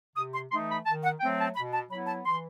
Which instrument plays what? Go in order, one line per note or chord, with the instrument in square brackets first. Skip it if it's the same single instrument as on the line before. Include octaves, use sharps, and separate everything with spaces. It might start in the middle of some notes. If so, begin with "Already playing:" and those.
[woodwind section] C3 D#6
C6
E3 A3 D#4 C6
B5
D#3 A5
F#5
F#3 A3 C4 G5
A5
B2 B5
A5
F#3 B3 E4 B5
A5
E3 C6